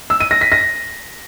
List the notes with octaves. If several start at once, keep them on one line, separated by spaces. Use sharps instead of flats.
E6
D#7
A#6
B6
A#6